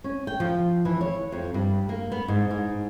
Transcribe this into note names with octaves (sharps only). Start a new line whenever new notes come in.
C#4
G5
F3
E3
C#5
F2
G2
A#3
B3
G#2
G#2